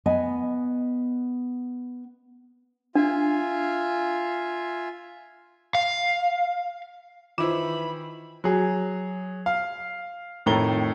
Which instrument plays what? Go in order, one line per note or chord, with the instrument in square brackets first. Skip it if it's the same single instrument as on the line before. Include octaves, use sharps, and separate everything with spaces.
[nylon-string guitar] B3 D#5 G#5
[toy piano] D4 [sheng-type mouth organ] F4 E5 G#5
[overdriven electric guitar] F5
[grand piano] D#3 E4 C5 [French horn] E3 [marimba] F4 [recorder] B5
[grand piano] F#3 G#4
F5
F2 A2 D#3 A3 A#5 G7